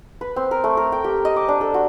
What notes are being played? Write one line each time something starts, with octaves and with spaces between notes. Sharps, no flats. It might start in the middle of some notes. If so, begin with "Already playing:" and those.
B4
C4
A#4
A3
A#4
G5
G4
D#5
D6
D4
A4
F#4